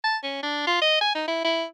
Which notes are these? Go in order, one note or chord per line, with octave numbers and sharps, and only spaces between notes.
A5
C#4
D4
F4
D#5
G#5
D#4
E4
E4